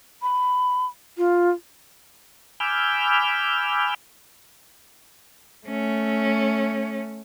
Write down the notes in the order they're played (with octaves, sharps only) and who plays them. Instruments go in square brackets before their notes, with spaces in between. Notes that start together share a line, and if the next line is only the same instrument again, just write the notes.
[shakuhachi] B5
F4
[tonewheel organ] G#5 B5 D6 E6 F6 G6
[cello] A3 C#4